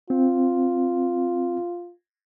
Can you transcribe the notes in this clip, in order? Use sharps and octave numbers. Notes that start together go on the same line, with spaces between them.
C4 F4